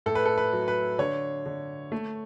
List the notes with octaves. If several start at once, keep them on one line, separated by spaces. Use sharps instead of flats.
A2 A4
B4
A4
B4
F#3
B4
D3 C#5
D3
A3